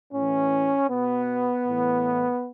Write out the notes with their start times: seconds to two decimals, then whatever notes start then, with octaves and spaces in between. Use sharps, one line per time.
0.13 A2 E3 C#4
0.90 B2 B3
1.66 A2 E3